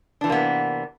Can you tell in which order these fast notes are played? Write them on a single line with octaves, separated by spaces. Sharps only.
D4 E3 C3 A#3 B3